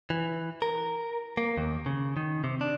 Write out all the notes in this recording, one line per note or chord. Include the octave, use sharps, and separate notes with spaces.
E3
A#4
A#3
D#2
C#3
D#3
C3
D4